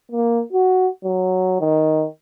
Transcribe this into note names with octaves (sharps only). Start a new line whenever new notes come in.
A#3
F#4
F#3
D#3